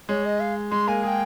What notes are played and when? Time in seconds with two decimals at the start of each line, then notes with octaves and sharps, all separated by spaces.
0.09 G#3 C#5
0.25 D#5
0.40 F5
0.71 G#3 C6
0.87 A#3 G#5
1.03 G#4 G#5
1.07 G5